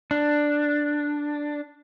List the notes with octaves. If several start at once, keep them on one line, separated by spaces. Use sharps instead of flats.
D4